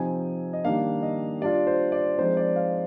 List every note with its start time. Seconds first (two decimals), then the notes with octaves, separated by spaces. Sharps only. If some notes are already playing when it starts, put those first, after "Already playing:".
Already playing: C3 F3 C4 D#4 G#5
0.53 D#5
0.65 D#3 G3 A#3 D4 F5
1.02 D#5
1.41 G3 D4 F4 D5
1.67 C5
1.92 D5
2.18 F3 G#3 C4 D#4 C5
2.37 D5
2.56 F5